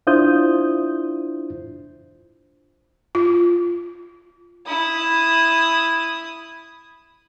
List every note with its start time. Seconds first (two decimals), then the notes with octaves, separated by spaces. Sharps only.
0.07 D4 E4 F4 C5 D#6 G6
3.15 F4
4.67 E4 D#6